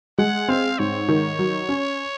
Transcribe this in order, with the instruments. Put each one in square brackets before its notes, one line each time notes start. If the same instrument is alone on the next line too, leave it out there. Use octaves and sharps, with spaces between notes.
[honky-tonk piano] G#3 [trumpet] F#5
[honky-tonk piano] C4 [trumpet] F5
[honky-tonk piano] G#2 [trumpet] C#5
[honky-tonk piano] D#3
F#3
C#4